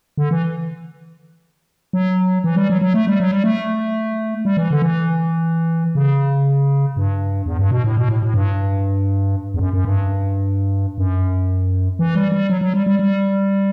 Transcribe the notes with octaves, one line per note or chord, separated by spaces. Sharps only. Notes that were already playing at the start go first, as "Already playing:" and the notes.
D3
E3
F#3
E3
G3
F#3
F#3
A3
G3
F#3
G3
A3
G3
E3
D3
E3
C#3
G2
E2
G2
B2
A2
B2
A2
A2
G2
E2
F#2
F#2
G2
F#2
E3
G3
G3
F#3
F#3
G3
G3
G3